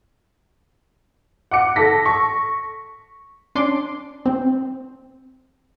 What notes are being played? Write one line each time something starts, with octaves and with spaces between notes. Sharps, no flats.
F#5 D6 C#7
A4 A#6 B6
C#6
C#4 D4 C6 D6
C4